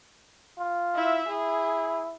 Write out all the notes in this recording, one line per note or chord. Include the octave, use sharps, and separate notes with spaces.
F4
E4 E5
E4 G#4